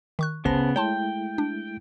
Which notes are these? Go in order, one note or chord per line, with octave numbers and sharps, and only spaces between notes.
D#3 C#6 F#6
G1 C#2 C#3 B3 C5 A5 A#6
G#3 A3 E4 C#5 G5 A5 C6
D4